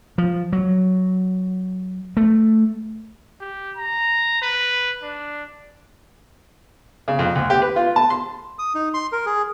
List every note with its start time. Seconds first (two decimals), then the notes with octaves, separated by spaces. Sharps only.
0.18 F3
0.53 F#3
2.17 A3
3.41 G4
3.77 A#5
4.42 B4
5.03 D4
7.08 C#3
7.19 F2
7.35 D2
7.50 G4
7.62 B4
7.76 F4
7.96 A5
8.10 C6
8.59 D#6
8.75 D#4
8.94 C6
9.12 A#4
9.26 G#4